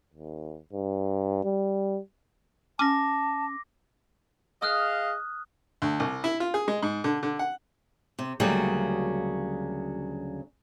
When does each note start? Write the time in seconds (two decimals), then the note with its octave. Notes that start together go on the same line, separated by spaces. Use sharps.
0.14 D#2
0.73 G2
1.44 G3
2.79 C#4 A5 D6 A#6
4.62 G#4 D#5 F5 D#6 F6 F#6
5.82 D2
6.00 C2
6.24 E4
6.40 F4
6.54 G#4
6.68 G#3
6.83 G#2
7.04 D3
7.23 D3
7.39 F#5
8.19 C3
8.40 D2 C#3 F#3 G3 A#3 F#4